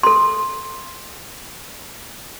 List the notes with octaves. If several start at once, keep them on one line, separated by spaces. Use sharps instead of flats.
A4 C6